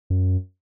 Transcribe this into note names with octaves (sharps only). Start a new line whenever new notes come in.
F#2